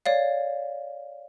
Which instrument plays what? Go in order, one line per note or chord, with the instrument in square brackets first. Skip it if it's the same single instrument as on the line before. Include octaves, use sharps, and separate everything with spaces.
[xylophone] C#5 D5 F5